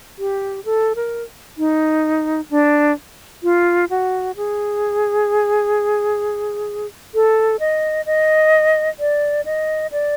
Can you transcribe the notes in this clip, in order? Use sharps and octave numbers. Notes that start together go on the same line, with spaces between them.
G4
A4
A#4
D#4
D4
F4
F#4
G#4
A4
D#5
D#5
D5
D#5
D5